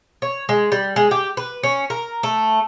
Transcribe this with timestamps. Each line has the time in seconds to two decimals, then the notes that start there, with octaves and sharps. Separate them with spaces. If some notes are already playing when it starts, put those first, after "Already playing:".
0.22 C#5
0.49 G#3
0.72 G3
0.96 G#3
1.11 G4
1.37 B4
1.63 C#4
1.90 A#4
2.23 A3